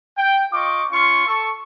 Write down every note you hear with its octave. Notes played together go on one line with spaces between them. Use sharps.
G5
F4 D#5 C#6 D6
C#4 F4 C6 C#6
A4 C#6